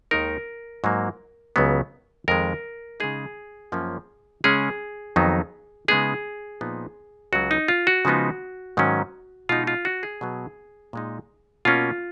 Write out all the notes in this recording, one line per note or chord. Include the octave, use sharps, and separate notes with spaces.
D#2 D#3 G#3 D#4 A#4
G#2 F#3 A#3
C#2 C#3 F#3 B3
F2 D#3 G#3 A#4
C#3 G#3 D#4 G#4
F#2 F3 A#3 C#4
C#3 G#3 C#4 G#4
F2 D#3 F#3 B3 D#4
C#3 G#3 B3 D#4 G#4
A#2 F3 B3 D#4
C#2 C#3 F#3 F#4
D#4
F4
F#4
C#3 F3 G#3 B3 D#4
G#2 D#3 F#3 C#4
B2 G#3 D#4 F4
F4
F#4
G#4
B2 F#3 B3
A#2 G#3 D#4
B2 A#3 C#4 F4